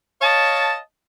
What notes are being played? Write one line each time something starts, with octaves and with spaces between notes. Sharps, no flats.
C#5 D#5 F5 A5